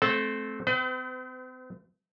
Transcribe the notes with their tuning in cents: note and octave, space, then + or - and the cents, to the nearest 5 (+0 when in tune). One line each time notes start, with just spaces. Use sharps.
A3 -20 C4 +0 A4 -20
C4 -40 B4 +45